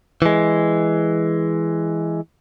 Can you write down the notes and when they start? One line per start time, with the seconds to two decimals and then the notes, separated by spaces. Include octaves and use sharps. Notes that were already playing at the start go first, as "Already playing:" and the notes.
0.22 E3 G#3